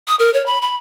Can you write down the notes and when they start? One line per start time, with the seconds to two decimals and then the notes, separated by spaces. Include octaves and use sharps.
0.08 D#6
0.19 A#4
0.34 C#5
0.46 B5
0.62 B5